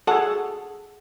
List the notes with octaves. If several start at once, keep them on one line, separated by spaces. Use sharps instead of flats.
F#4 G#4 A4 F#5 A5